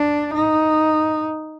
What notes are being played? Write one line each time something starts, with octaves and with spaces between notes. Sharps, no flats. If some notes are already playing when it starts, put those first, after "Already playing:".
Already playing: D4
D#4